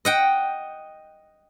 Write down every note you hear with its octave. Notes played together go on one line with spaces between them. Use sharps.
D#5 F#5 G5